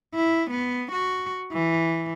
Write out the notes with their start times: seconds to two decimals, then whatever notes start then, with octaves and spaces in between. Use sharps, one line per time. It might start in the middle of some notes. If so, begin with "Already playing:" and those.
0.15 E4
0.51 B3
0.92 F#4
1.53 E3